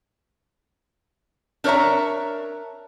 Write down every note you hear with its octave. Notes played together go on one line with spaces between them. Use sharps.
D4 A#4 C#5 E5 A#5